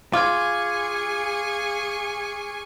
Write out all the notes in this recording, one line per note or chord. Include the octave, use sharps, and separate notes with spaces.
F4 G#4 G#5 C#6 D6 F6 G#6